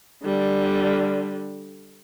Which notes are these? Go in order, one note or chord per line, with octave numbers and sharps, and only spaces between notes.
D3 G3